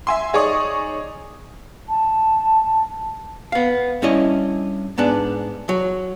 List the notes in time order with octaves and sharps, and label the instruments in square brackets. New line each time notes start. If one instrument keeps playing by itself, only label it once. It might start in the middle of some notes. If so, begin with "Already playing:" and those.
[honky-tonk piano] E5 G#5 C6
D#4 G#4 C#5 D5 C#6 D#6
[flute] A5
[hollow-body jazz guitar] B3 F5
G2 C#4 E4 D#5
G#2 B3 D4
F#3